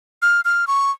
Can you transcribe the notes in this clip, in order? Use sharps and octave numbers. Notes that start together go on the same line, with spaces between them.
F6
F6
C#6